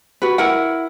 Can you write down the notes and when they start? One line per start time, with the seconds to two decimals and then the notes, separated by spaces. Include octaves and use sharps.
0.22 F#4 B4
0.38 E4 A#4 F#5